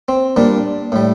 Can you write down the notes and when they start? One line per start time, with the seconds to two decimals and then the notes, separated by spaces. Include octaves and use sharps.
0.08 C4
0.36 A#2 G3 D4
0.92 A2 G3